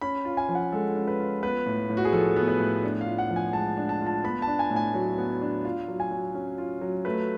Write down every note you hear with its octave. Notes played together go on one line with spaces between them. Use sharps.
C#4 B5
F4
G#5
F3
F#5
G#3 A4
C#4
B4
F4
B3 B4
A2
A2
F#4
G#4
F3 A4
B3
B4
A2
D4
F5
F4
F#5
F3
G#5
G#3 A5
D4
A5
F4
A5
B3 B5
A5
D4
G#5
A2
G#5
F#3
B3
D4
F4 F5
F#3
G#5
F#3
C#4
F4
F#3
A3 B4